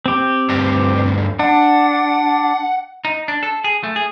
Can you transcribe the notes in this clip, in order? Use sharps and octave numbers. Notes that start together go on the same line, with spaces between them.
C4 G4
D2 G2
D4 F#5
D#4
D4
A4
G#4
A3
G#4